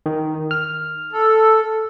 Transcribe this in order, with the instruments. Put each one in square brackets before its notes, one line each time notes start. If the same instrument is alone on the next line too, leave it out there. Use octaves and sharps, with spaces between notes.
[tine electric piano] D#3
F6
[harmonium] A4